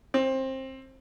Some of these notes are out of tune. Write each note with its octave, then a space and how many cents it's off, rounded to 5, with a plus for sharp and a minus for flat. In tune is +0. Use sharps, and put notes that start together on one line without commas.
C4 +20